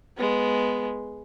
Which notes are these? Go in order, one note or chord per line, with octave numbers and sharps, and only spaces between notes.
G#3 B3